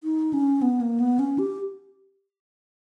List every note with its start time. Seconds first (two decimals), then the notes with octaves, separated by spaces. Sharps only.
0.04 D#4
0.33 C#4
0.62 B3
0.81 A#3
1.00 B3
1.19 C#4
1.39 G4